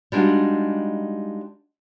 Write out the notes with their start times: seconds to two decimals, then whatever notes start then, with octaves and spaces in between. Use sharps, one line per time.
0.12 G3 G#3 D4 D#4 F4 F#4